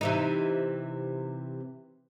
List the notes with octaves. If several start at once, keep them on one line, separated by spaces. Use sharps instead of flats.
C3 E3 D#4